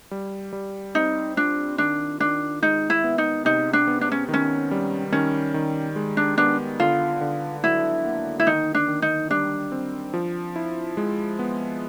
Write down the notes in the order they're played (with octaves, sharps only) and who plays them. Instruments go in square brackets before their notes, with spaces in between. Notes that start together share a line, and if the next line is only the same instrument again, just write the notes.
[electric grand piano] G3
G3
[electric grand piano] C4 [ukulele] D#4
[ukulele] D4 [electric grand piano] F4
[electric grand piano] D#3 [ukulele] D4
[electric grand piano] D#3 [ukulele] D4
[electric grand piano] G#3 [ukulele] D#4
[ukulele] E4
[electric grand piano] B3
[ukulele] D#4
[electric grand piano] C3 [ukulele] D#4
[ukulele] D4
[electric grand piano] B3
[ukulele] D4
C#4
[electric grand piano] D#3
[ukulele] C#4
[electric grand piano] G3
[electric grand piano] D#3 [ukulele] C#4
[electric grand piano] D#3
G#3
[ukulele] D4
[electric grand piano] B3 [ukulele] D4
[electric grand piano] D3 [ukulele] F4
[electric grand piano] D3
[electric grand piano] F#3 [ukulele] E4
[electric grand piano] A#3
[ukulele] E4
[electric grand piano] D#3 [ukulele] D#4
[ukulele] D4
[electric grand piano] D#3
[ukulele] D#4
[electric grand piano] G3 [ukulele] D4
[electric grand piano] C4
F3
E4
G#3
B3